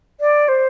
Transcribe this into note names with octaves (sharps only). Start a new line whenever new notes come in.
D5
C5